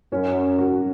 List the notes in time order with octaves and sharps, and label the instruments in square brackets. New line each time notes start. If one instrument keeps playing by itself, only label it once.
[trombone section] F#2 [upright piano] C#4
[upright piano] F#4